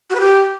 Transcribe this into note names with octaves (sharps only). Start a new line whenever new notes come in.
F#4
B4
G4